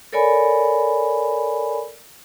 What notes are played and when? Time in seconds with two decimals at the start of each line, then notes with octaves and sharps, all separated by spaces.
0.13 A4 A#4 C#5 D5 G#5 B5